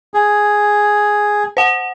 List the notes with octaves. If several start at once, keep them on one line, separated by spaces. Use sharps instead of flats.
G#4
C5 F#5